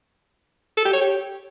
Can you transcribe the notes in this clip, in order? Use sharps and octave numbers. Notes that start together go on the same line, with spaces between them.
A4
G4
C#5
G4